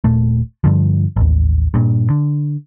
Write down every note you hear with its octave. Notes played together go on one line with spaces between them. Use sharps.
D#1 A#2 A3
G2 D3 F3
A1 D#2
G2 A#2
D3